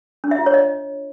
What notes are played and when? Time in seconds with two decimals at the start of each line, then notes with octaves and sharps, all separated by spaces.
0.24 D4
0.31 E5
0.39 F4
0.46 C#5
0.54 D#5